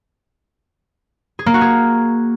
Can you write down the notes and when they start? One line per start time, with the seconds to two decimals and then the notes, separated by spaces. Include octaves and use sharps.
1.39 G#4
1.46 A#3
1.54 F#4
1.61 G#4